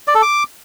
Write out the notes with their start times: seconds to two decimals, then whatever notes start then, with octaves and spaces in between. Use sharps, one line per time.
0.08 D5
0.15 A4
0.22 D6